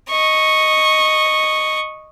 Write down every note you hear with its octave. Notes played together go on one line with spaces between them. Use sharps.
D#5 C#6